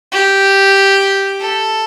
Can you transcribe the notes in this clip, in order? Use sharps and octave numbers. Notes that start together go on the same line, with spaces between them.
G4
A4